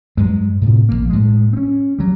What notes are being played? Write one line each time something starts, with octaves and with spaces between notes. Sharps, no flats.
G2 F#3 G#3
A2 C3
A#1 D#2 A#3
A2 G#3
C4 C#4
F#3 G3